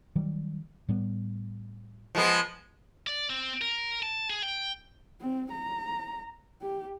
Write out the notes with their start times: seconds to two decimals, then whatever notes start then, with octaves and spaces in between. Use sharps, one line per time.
0.16 D#3 F#3 G3
0.89 A2 G3 B3
2.15 F3 G#3 B3
3.07 D5
3.30 C4
3.61 A#4
4.03 A5
4.30 G#4
4.43 G5
5.21 C4
5.51 A#5
6.62 G4